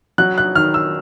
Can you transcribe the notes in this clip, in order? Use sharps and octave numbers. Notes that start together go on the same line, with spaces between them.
F#3 F#6
F#6
D#3 F6
E6